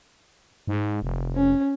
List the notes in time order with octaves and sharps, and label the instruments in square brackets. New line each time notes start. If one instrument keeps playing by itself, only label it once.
[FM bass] G#2
F1
[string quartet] C#4